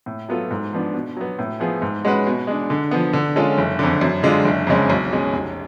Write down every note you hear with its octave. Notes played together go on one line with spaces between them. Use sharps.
A2
F#3 B3 F4 A4
G#2
F3 B3 D4
B2
F#3 B3
A2
F3 B3 F4 G#4
G#2
G#3 C#4 F#4 B4
B2
G#3 D4
D3
F3 B3
D3
G#3 C#4 F4 A4
F#1
F2 D3
F#2
D3 G#3 D4 F4
F#1
F2 C#3 G#3 C#4
B1
B2 G#3 C#4
F1